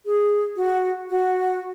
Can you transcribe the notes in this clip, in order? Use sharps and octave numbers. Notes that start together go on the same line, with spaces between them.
G#4
F#4
F#4